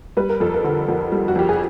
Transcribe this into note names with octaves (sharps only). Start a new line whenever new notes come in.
G3 B4
A#4
F2 A4
A#4
D3
F2
G3
F#4
F2 G4
G#4